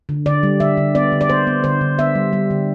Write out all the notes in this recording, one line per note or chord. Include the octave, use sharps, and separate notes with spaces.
D3
D3 D5
G3
D3 E5
D3
B3 D5
D3
D5
B3 C5
B3
D3 C5
D3
B3 E5
G3
G3
D3